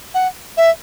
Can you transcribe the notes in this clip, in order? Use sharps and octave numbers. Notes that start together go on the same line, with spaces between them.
F#5
E5